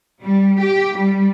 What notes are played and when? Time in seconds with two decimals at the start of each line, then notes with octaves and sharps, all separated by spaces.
0.22 G3
0.60 G4
0.96 G3